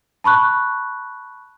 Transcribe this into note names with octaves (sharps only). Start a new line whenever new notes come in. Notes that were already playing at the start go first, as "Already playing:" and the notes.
A5 B5 C#6 F#6